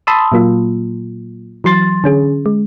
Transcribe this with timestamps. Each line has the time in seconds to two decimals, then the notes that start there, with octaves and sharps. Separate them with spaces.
0.07 A5 B5 C6 D#6 E6
0.32 A#2 F#3 A#3 F4
1.64 E3 F#3 C6 A6
2.04 D3 C#4 G#4
2.46 G#3